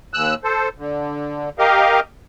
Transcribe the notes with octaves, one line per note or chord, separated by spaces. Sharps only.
D#2 E6 F#6
A4 C5
D3
G4 A#4 D#5 F5